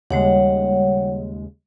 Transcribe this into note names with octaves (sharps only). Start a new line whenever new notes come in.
D#2 C#3 G3 G#3 C#5 F#5